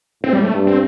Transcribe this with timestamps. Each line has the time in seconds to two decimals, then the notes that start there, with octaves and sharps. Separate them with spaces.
0.23 A2 C4
0.33 G3
0.43 A3
0.53 G2
0.67 C4